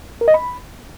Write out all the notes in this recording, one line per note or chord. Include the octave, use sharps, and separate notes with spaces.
A#4
D#5
B5